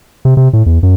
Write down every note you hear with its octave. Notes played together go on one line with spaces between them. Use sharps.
C3
C3
A2
E2
F#2